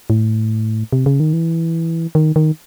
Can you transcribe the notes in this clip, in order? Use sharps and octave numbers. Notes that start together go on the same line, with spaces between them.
A2
C3
C#3
D#3
E3
D#3
D#3